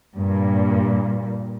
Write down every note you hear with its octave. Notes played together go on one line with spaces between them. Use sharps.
G2 A#2